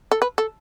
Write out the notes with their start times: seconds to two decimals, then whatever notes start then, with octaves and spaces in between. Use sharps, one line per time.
0.11 A4
0.22 B4
0.38 A4